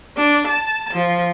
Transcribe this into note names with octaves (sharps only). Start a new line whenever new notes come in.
D4
A5
F3